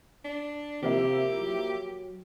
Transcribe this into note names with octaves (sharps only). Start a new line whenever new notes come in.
D4
C3 F3 A#3 E4 G4
F#3